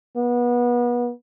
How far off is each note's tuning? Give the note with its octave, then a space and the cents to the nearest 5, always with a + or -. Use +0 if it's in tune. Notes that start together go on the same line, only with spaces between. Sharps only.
B3 -30